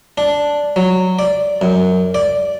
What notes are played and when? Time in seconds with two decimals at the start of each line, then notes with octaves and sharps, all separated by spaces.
0.18 D4
0.76 F#3
1.19 D5
1.61 F#2
2.15 D5